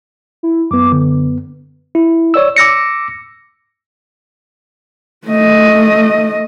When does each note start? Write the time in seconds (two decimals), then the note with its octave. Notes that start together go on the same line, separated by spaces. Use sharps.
0.43 E4
0.71 F#2 B3 D6
0.92 D3
1.95 E4
2.34 C#5 D5 E6
2.56 D6 E6 A#6 C#7
5.27 A3 D#5